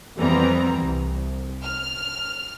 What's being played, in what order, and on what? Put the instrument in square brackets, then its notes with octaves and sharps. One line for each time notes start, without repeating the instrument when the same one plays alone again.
[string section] F2 E3 G3 B3 C4 A#5
C2
F6